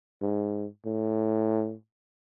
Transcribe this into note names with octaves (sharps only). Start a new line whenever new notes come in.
G#2
A2